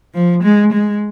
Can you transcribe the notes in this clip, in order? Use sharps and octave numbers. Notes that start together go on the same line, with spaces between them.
F3
G#3
G#3